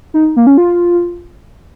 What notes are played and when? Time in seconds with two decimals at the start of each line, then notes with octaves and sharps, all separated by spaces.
0.14 D#4
0.36 A#3
0.47 C#4
0.58 F4